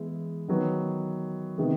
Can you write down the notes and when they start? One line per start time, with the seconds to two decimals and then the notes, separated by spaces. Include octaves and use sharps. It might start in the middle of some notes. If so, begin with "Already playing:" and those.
Already playing: E3 G#3 B3 E4
0.48 D#3 F#3 B3
1.58 C3 D#3 G#3 B3